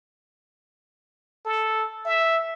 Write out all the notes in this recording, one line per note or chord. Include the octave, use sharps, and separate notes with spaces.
A4
E5